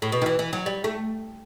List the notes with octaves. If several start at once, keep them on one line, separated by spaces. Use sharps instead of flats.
A2
B2
D#3
E3
E3
F#3
G3
A3